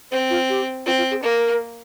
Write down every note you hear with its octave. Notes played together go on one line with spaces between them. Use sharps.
C4 C5
F4
G4
C4 F4
F4
G#4
A#3 A#4